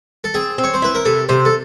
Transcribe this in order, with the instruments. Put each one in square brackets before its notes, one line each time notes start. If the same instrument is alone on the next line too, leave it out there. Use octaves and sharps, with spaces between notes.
[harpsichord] A4
[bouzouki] C4 [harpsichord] G#4
[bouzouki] C4
[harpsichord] C#5
C5
[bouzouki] E4 [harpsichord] B4
[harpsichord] A#4
[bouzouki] C3 [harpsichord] A4
[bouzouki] C3 [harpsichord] C5
[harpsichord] A4